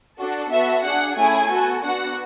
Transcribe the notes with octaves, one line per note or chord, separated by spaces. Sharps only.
D4 F#4 A4
B3 F#4 A4 E5
D4 G#4 F#5
A3 C#4 E4 G#4 G#5
B3 F#4 A4
B3 D4 F#4 F#5